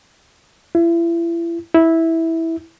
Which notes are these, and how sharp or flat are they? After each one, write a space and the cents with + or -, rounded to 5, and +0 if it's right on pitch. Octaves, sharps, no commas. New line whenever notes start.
E4 +35
E4 -10